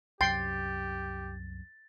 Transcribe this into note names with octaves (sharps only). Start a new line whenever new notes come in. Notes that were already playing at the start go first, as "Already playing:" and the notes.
C2 F#2 G4 G5 C6 A6